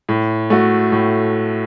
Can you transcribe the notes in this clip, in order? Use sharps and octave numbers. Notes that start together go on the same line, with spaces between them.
A2
A3 F#4
A2